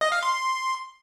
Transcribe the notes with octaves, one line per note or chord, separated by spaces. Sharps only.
D#5
F5
C6